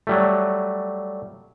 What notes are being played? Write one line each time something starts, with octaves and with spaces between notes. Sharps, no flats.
F#3 G3 A3